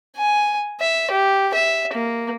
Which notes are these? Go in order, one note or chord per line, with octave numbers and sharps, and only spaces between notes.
G#5
E5
G4
E5
A#3